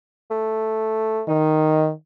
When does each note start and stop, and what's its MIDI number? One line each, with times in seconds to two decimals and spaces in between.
0.31 1.22 57
1.29 1.91 51
1.29 1.88 63